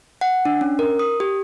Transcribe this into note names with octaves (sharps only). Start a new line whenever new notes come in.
F#5
D4
C#4
A#4
D#6
G4